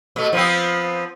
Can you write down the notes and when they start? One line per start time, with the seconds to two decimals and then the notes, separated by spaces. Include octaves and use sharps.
0.16 B2 A3
0.33 F3 B3 C4